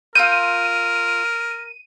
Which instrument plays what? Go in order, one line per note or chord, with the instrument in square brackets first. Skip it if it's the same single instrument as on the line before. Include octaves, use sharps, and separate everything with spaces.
[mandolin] F4 E6 G6 [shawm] A#4 [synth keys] D#7